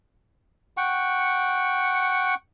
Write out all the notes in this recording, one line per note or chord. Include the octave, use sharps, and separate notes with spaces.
F#5 G5 C#6